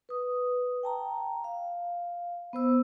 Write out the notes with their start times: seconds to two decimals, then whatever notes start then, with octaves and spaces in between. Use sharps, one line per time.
0.09 B4 D#6
0.83 G5 A5 A#5
1.44 F5
2.53 B3 C5 E6